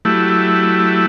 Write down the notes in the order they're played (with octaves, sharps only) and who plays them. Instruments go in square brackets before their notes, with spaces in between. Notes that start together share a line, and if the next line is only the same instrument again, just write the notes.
[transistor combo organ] F#3 A3 E4 G4